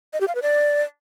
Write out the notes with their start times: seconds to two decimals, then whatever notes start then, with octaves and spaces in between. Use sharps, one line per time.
0.13 D#5
0.21 G4
0.28 F5
0.35 B4
0.42 D5